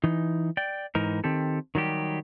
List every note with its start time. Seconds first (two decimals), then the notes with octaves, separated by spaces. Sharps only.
0.04 E3 D#4
0.57 D5 G5
0.95 G#2 E3 D#4 A#4
1.24 D#3 C4 G4 A4
1.75 D#3 F#3 G3 G4